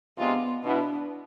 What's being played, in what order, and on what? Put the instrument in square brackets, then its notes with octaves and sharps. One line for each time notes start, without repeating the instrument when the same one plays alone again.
[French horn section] C3 G#3 D4 F4 [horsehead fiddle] B3
[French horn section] B2 B3 E4 [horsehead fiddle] D4